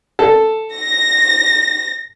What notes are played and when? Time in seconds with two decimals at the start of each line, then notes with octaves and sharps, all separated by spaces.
0.19 A4
0.75 A#6